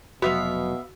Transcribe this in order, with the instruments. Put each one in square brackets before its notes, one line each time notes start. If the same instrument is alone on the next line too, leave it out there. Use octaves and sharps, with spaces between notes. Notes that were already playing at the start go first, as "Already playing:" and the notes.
[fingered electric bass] F1 F#3 [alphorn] B2 [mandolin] B3 E5 F5 [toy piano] F#4